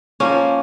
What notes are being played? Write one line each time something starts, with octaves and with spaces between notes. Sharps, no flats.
F3 A#3 C#4